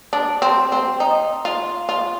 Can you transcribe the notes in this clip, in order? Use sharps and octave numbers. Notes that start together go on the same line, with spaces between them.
D4
C4
C4
D#4
F4
F4